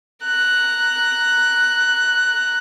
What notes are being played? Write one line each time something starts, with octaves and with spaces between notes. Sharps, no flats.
A#5 F#6